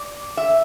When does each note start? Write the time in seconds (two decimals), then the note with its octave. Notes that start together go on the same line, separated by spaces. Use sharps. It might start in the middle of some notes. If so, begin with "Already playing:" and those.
Already playing: D5
0.37 E5